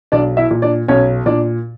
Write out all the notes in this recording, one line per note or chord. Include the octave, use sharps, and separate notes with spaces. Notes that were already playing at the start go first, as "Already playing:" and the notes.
B1 D4 D5
E4 E5
A#2
D4 D5
B1 C#4 C#5
A#2 D4 D5